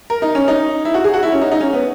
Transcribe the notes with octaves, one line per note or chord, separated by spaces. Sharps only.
A#4
D#4
C#4
D#4
E4
F#4
G#4
F#4
E4
C#4
D#4
D#4
C#4
B3